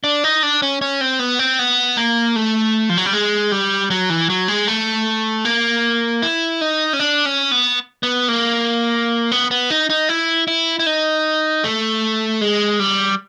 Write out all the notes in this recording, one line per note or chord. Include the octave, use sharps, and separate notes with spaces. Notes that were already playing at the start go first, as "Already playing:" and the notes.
D4
D#4
D4
C#4
C#4
C4
B3
C4
B3
A#3
A3
F3
F#3
G3
G#3
G3
F#3
E3
F#3
G#3
A3
A#3
E4
D#4
C#4
D4
C#4
B3
B3
A#3
B3
B3
D#4
D#4
E4
E4
E4
D#4
A3
G#3
G3